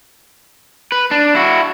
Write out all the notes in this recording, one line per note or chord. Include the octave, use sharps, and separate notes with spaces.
B4
D4
E4 F#4